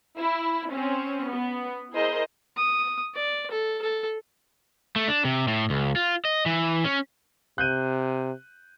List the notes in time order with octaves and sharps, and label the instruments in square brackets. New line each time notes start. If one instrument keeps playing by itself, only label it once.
[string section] E4
C4 C#4
B3
E4 G#4 A#4 C5 D#5
[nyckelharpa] D#6
D5
A4
A4
[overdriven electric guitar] A3
D4
C3
A2
C#2
F4
D#5
E3
C#4
[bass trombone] C3 [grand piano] F#6 G6 D#7